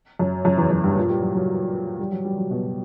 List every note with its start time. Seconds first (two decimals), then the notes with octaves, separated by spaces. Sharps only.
0.19 F#2
0.45 F#2
0.57 E2
0.70 F#2
0.84 G2
0.96 A#2
1.09 G3
1.22 F#3
1.35 F#3
1.99 G3
2.12 F#3
2.25 G3
2.38 F#3
2.51 B2